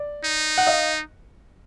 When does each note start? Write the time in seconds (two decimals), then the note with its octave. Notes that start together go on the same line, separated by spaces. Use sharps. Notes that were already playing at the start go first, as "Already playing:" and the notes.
Already playing: D5
0.25 D#4
0.58 F#5
0.66 D#5 F5